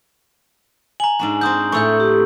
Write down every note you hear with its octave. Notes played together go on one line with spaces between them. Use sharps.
G#5 A#5 F#7
G#2 D4 F#4
C4 F#4 C6 D#6 G6
A2 A3 C#6 E6 G6
G4